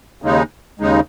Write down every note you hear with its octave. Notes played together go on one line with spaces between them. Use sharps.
D#2 C#3 G#3 D#4
D#2 C#3 G#3 D#4